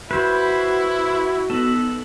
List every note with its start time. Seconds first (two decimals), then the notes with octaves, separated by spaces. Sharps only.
0.11 E4 F#4 B4 C5
1.50 B3 D#4 A4 F#7